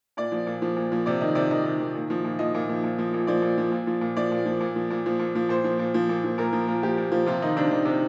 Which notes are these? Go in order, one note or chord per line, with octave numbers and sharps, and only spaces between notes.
A#2 D5
F3
A#2
F3
A#2
F3
C3 D5
D#3 D#5
C3 D5
D#3 D#5
C3
D#3
A#2
F3
A#2
F3 D#5
A#2
F3
A#2
F3
A#2
F3 D5
A#2
F3
A#2
F3
A#2
F3 D5
A#2
F3
A#2
F3
A#2
F3
A#2
F3
A#2 C5
F3
A#2
F3
A#2
F3
A#2 A#4
F3
A#2
F3 G4
A#2
F3
C3 F4
D#3 D#4
C3 D4
D#3 D#4
C3